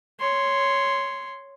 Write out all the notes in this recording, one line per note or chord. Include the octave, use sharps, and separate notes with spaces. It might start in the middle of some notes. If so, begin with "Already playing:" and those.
C#5 C6